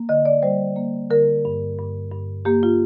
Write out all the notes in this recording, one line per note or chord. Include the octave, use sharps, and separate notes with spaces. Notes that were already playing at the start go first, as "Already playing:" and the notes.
Already playing: A#3
D3 D#5
D5
G3 C5
A#3
D3 A#4
G2
G2
G2
A#3 G4
F4